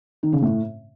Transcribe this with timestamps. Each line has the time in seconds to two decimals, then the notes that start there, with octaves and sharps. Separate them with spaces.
0.23 D#3
0.32 C#3
0.42 A2